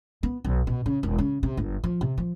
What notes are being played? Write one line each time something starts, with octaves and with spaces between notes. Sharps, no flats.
B3
B1
B2
C#3
E1
C#3
C3
G1
F3
C3
F3